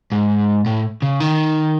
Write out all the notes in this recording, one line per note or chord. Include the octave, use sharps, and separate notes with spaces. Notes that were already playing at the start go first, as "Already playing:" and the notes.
G#2
A2
C#3
D#3